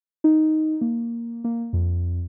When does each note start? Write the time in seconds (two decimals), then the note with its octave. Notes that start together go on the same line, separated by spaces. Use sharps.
0.24 D#4
0.81 A#3
1.44 A#3
1.73 F2